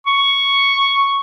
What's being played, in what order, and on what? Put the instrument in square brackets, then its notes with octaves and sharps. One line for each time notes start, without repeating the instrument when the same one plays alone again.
[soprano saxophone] C#6